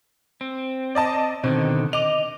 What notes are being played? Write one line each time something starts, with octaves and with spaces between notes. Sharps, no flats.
C4
D5 D#5 A5
B2 D3 D#3 C4
D#5 D6 F7